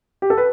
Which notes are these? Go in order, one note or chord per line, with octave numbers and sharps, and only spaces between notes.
G4
A4
B4